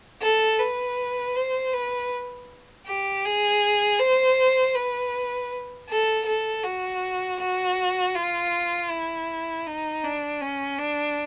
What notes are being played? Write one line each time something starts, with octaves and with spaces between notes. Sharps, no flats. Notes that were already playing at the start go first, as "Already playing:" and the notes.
A4
B4
C5
B4
G4
G#4
C5
B4
A4
A4
F#4
F#4
F4
E4
D#4
D4
C#4
D4